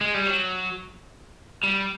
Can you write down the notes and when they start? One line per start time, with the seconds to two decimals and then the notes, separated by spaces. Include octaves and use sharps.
0.01 G#3
0.14 G3
0.27 F#3
1.64 G3